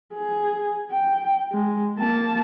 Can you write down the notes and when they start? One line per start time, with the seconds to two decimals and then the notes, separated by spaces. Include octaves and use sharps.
0.13 G#4
0.91 G5
1.52 G#3
1.99 A#3 A5